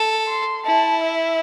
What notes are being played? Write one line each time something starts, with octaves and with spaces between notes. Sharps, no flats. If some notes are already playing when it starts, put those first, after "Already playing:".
Already playing: A4
C6
E4 A5
E5